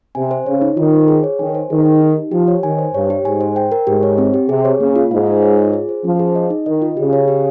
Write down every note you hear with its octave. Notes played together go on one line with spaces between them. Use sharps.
C3 G#5
C5
C#3 C#5
D#4
D#3 F4
C5
G#4
C#5
D#3 G#5
C5
D#3 G#4
D#5
D#4
G4
F3 G4
C#5
D#3 G#5
C5
G2 C#5
G4
G#2 G#5
C5
G5
A#4
G#2 G4
C#5
C4
G4
C3 G#4
C#5
C#3 A#3
F4
G#2 F5
F4
C#5
F4
G#4
C5
F3 C#4
G#4
D#5
D#4
D#3 D#5
F4
C#3 G4
C#5
G4